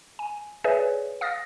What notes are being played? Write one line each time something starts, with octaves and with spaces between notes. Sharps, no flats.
G#5
G#4 B4 C#5 D5 E5 G#5
F5 D#6 F6 A6 A#6